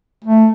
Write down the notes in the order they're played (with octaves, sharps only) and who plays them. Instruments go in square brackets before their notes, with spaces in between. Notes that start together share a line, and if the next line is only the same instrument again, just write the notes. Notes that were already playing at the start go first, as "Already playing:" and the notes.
[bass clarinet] A3